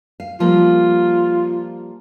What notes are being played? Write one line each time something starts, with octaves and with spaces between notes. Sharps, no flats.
F5
F3 G3 A#3 F4